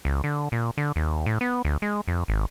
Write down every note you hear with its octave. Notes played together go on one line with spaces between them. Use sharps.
C#2
D3
A#2
D3
D#2
A2
B3
D2
G#3
F2
G#1